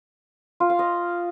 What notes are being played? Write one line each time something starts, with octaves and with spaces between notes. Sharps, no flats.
F4
F5
D#5